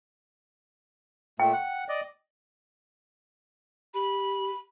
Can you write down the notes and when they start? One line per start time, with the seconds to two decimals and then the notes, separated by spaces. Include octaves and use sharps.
1.40 A#2 A3 G5
1.53 F#5
1.89 D5 D#5
3.94 G4 B5